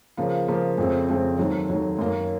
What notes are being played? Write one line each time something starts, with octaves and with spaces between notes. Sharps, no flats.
C#3 F3 A#3 F4
C#3 F3 A#3 F4
F2 C#3 A3 C4
F2 C#3 A3 C4
D#2 D#3 F#3 A3
D#2 D#3 F#3 A3
F#2 D#3 A#3 C#4